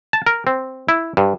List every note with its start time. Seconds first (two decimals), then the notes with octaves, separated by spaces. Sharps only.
0.13 A5
0.26 A#4
0.47 C4
0.89 E4
1.17 G2